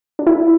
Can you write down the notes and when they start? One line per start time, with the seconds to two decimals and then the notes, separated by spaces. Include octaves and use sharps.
0.19 D4
0.27 E4